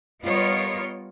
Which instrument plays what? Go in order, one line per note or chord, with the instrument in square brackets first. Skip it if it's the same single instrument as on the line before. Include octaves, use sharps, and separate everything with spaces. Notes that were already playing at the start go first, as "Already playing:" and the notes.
[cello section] G3 B3 F4 A#4 C#5 D#5